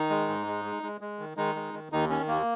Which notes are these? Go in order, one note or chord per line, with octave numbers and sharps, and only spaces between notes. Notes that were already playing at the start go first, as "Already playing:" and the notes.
Already playing: D#3 D#4
G#3
G#2
G#3
G#3
G#3
G#3
D#3
D#3 G#3 D#4
G#3
D#3
D#2 D#3 D#4
D#3 C#4
D#2 A#3